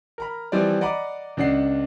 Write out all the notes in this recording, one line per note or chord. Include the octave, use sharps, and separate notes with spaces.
A#4 A#5 B5
E3 F3 G3 C4 G4 D5
D5 D#5 F#5 A#5 B5 D6
C#2 D4 F#5 C7